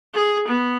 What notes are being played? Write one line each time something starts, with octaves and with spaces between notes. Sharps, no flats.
G#4
B3